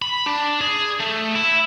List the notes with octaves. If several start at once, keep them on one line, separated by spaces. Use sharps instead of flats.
B5
D4
G#4
A3
E4